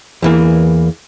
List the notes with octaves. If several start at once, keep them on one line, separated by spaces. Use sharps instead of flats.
E2 E3 A#3